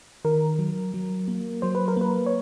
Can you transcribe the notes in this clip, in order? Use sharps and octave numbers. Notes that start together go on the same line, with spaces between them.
D#3 A#4
F#3
F#3
A#3
F#3 C5
B4
A#4
A#3 B4
C#5